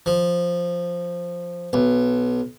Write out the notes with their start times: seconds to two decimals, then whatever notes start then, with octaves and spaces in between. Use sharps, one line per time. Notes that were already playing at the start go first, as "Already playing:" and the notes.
0.06 F3
1.73 B1